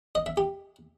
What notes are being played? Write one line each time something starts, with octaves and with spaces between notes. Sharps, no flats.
D#5
E5
G4